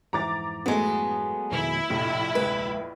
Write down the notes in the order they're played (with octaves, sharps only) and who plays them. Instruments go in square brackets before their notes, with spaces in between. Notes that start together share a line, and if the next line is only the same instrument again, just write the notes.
[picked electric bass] F2 G#2 E3 [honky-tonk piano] A#5 D6 A6
[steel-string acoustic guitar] F#3 G#3 [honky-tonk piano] A3 B3
[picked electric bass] F2 B2 D#3 [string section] E4
[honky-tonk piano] A#1 F2 [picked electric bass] A2 C3 D4
[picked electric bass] D1 C3 G#3 [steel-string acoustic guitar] B4